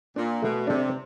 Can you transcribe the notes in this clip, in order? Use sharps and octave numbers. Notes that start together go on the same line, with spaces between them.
A#2 D4
B2 A3
C3 D4